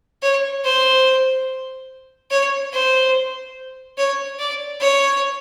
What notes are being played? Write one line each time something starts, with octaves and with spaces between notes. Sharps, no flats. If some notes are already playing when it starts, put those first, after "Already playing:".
C#5
C5
C#5
C5
C#5
D5
C#5